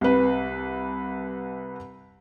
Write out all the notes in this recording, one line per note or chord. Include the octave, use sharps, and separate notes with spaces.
C2 B4